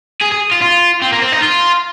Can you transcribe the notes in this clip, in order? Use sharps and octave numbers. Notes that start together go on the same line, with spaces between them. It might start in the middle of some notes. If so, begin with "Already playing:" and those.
G#4
G#4
F4
F4
C4
A#3
C4
D#4
F4